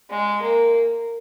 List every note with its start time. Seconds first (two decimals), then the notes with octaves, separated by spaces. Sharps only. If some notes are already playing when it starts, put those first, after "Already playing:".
0.10 G#3
0.42 A#3